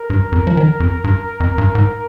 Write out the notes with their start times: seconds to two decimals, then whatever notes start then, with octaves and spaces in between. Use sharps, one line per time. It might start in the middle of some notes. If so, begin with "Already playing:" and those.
Already playing: A#4
0.10 G2
0.32 F2
0.47 F3
0.57 D#3
0.80 F2
1.04 G2
1.40 F2
1.58 G2
1.75 G#2